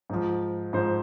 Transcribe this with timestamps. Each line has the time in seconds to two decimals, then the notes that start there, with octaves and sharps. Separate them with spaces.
0.10 G#2 F3
0.73 G#2 F3 C5